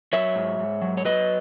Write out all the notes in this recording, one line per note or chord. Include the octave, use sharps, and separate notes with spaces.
F#3 C#5 E5
G#2
G#2
F#3
C#5
F#3 B4 D#5